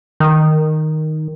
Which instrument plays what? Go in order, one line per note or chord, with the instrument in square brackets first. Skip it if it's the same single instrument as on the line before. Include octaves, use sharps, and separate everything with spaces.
[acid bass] D#3